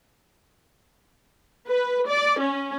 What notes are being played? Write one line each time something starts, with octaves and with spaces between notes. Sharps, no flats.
B4
D5
C#4